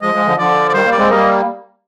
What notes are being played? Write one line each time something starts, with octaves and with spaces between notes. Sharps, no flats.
F3 G#3 D#5
F3 G#3
D3 F3
D3 F3 D5
D5
D#3 G3 C5
G3 A#3
D5
G#3 C4
G3 A#3 D#5